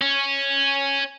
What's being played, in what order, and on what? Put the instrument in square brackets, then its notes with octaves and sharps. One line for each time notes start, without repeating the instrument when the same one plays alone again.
[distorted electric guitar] C#4